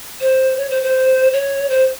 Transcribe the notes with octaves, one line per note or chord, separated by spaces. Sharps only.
C5
C#5
C5
C5
C#5
C5